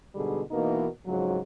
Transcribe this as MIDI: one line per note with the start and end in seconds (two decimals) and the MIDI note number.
0.15 0.41 44
0.15 0.41 47
0.15 0.41 50
0.15 0.41 55
0.15 0.41 68
0.51 0.85 47
0.51 0.85 52
0.51 0.85 58
0.51 0.85 63
0.51 0.85 70
1.06 1.39 41
1.06 1.39 44
1.06 1.39 49
1.06 1.39 54